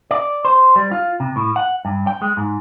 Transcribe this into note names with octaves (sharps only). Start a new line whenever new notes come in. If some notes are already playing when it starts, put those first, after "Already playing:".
D5
C5
G3
F4
C3
A2
F#5
G2
G5
G#3
G#2